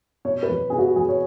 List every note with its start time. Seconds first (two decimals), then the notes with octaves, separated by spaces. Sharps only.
0.25 B2 C#5
0.43 B4
0.49 E2
0.70 B2 G#4
0.79 F#4
0.96 E2 G#4
1.09 C#5